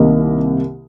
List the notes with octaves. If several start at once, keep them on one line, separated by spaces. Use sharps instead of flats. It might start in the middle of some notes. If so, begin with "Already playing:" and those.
Already playing: C2 C3 D#3 A#3 A#4 D#5